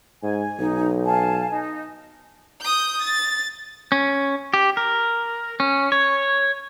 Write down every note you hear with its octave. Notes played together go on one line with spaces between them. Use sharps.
G#2 G#5
B1 D#4
F5 G#5 A5
D#4
D#6 G6
A6
C#4
G4
A#4
C#4
C#5